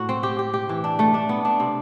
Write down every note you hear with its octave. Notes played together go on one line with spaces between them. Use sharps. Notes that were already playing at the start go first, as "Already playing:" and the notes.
Already playing: A2 F#4
C4
G4
G4
G4
E3
D4
A3
D4
B3
D4
C3